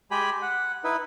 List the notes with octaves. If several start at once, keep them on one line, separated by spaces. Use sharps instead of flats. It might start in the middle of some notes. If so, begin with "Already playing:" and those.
G#3 G4 G#5 B5
F#5
D#4 E4 B4